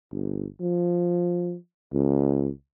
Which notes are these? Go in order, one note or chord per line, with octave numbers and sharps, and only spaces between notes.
G1
F3
C#2